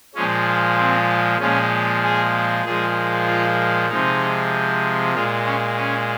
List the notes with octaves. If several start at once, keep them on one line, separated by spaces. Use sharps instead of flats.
A#2 F3 G#3 C#4
C4
A#2 F3 G#3 C#4
G#4
A#2 F3 G#3 G#4
F4
C3 F3 G#3 D#4
A#2 G#3 F4
C#4
C#4